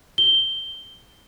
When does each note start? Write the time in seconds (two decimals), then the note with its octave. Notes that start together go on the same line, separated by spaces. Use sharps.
0.18 G7